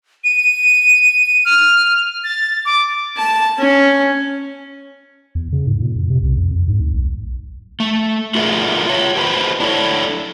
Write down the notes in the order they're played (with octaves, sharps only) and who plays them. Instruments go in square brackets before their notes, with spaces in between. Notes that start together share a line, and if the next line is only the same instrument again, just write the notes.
[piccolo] D#7
F6
A6
D6
[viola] A5
C#4
[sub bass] E2
C#3
G#2
A#2
F2
C3
C2
F2
F2
G#2
D2
B1
[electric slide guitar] A3
F4 F#4 G#4 A#4 B4 E5
F4 C#5
G4 B4 C5
D4 E4 A4 C#5